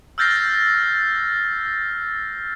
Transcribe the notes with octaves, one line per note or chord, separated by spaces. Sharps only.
E6 F6 G6 A6 A#6 C7